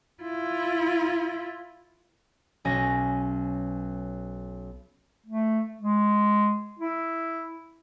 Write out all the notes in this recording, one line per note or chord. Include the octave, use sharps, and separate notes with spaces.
E4 F4
B1 C#4 G#5 A#6
A3
G#3
E4